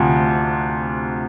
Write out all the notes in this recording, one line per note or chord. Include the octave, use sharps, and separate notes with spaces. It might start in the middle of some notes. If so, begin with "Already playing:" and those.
Already playing: D2 C3 F3